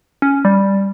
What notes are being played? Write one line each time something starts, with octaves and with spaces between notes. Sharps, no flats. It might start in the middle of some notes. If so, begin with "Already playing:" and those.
C#4
G3